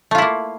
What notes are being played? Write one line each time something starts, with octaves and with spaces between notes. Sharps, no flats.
A3 A#3 E4 F4